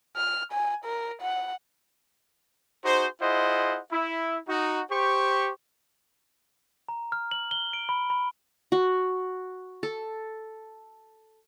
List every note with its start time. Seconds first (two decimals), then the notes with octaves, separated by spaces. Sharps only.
0.16 F6
0.52 G#5
0.85 A#4
1.22 F#5
2.85 D#4 F#4 G#4 C5
3.21 E4 F4 G#4 C5 D#5 F#5
3.92 E4
4.48 D#4 F#4
4.91 G4 C5 C#6
6.89 A#5
7.12 F6
7.31 F#7
7.51 G7
7.73 D7
7.89 B5
8.10 B5
8.72 F#4
9.83 A4